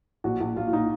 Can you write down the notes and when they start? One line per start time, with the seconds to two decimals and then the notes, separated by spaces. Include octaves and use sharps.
0.24 A#1 F#4
0.40 A#1
0.56 A#1 F4
0.68 F4
0.73 A#2 D#4